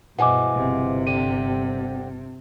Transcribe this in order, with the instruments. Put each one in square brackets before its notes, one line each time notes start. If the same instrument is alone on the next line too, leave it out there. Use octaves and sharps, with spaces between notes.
[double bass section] G2 B2 [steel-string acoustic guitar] E3 F3 G#3 [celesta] F#5 G#5 D6
[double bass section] G1 [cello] C3
[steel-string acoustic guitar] D3 C4 G4 [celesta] D#7